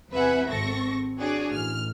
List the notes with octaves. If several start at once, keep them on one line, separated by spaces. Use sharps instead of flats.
E2 C3 B4 E5 F#5 G#5
G#1 C4 A4 C#6 A#6
D4 F#4 G#4 C#5 D5
A1 F6